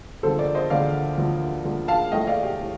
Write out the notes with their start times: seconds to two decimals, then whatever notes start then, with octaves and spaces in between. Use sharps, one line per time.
0.23 D2 D3 F3 A#3 A4 C5
0.39 A#4 D5
0.55 C5 D#5
0.70 D2 D3 F3 A#3 D5 F5
1.17 D2 D3 F3 A#3
1.64 D2 D3 F3 A#3
1.88 F5 A5
2.12 A#1 A2 A3 D#5 G5
2.27 D5 F5
2.43 G4
2.61 A2